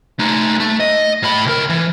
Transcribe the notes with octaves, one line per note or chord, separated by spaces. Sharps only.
A3 D#4
A3
D#5
A2 B5
C#2 A#4
E3